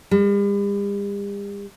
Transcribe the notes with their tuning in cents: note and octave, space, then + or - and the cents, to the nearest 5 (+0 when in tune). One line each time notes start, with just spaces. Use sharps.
G3 +45